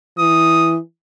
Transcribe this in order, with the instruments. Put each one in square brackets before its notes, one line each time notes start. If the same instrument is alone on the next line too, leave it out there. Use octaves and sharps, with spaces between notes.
[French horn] E3 [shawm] D#6